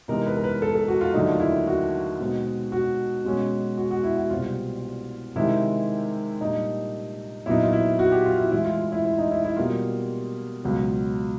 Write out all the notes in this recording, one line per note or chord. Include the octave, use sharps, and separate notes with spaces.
C3 E3 G#3 B3 D#4 A#4
B4
A#4
B4
A4
A4
F#4
F4
D#2 D3 F#3 A3 D4 D#4
F4
E4
F#4
B2 G#3 C4 D#4
F#4
B2 G#3 C#4
F#4
F#4
E4
F#4
C2 B2 G3 C4 F4
C3 D#3 G#3 C4 E4
A#2 G3 A#3 D4 D#4
A#2 F#3 B3 D#4 E4
F4
E4
F#4
G4
F4
E4
A2 E3 G#3 E4
F4
E4
E4
D#4
E4
E4
B2 G3 A#3 F4
C#2 B2 F#3